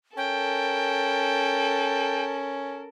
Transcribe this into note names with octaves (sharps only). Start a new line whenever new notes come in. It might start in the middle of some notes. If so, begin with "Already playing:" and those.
C#4 A4 A#4 G5